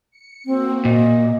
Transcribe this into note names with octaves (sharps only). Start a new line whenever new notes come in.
C#7
A#3 C4 F#4
A#2 D#5